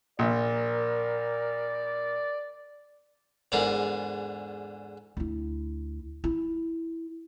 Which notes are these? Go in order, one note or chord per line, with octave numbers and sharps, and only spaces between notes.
A#1 A#4 D5
E2 G#2 D3 F4 A#4 D5
D2 E4
E4